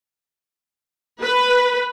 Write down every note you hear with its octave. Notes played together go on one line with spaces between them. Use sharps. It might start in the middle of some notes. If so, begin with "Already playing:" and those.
B4